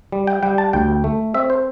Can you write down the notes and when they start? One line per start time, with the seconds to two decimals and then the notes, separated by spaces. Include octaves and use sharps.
0.12 G3
0.27 G5
0.43 G3 G5
0.58 A5
0.73 D2 G5
1.04 A3
1.34 C4 E5
1.50 C5